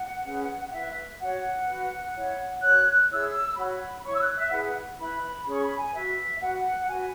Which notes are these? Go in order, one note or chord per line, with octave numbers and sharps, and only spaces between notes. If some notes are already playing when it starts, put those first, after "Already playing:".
Already playing: F#5
C#4 G#4 B4
F#5
E4 B4 E5
E5
F#4 C#5 F#5
F#4 B4
E4 C#5
F#4 C#5 F#6
F#6
E4 G#4 C#5 E6
F#4 C#5 B5
E4 C#5 C#6
E6
F#6
E5
E4 G#4 B4 F#5
E4 B4 B5
C#4 G#4 C#5 C#6
B5
G#5
F#4 B4 E5
F#4 B4 F#5
F#4 B4 G#5